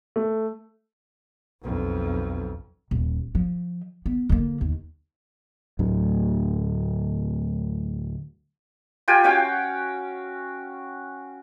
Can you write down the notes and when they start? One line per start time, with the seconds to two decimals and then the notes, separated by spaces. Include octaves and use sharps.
0.16 A3
1.63 B1 F2
2.91 D#1
3.35 F3
4.06 B3
4.29 D3 A#3
4.61 D#2
5.79 D2 A2 D3 F#3
9.08 F4 G4 G5 G#5
9.24 C#4 F#4 F5 G5